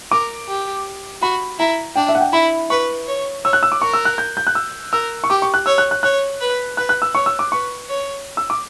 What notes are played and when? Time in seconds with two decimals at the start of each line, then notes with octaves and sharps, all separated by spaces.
0.11 A#4 D6
0.48 G4
1.22 F#4 B5
1.59 E4 A#5
1.96 D4 G5
2.08 E5
2.15 F#5
2.20 G5
2.33 E4 B5
2.70 B4 C#6
3.07 C#5
3.44 C#5 E6
3.53 F#6
3.63 E6
3.72 D6
3.81 A#4 C#6
3.93 E6
4.05 F#6
4.18 G6
4.37 G6
4.47 F#6
4.55 E6
4.92 A#4 E6
5.24 C#6
5.30 G4 D6
5.42 C#6
5.54 F#6
5.66 C#5 E6
5.78 F#6
5.91 F#6
6.03 C#5 F#6
6.41 B4
6.77 B4 F#6
6.89 F#6
7.02 E6
7.15 C#5 C#6
7.26 E6
7.39 D6
7.52 B4 C#6
7.88 C#5
8.37 E6
8.50 D6